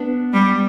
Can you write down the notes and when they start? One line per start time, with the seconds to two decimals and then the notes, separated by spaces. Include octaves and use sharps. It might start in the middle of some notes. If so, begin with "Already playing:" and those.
Already playing: B3 D4
0.33 G3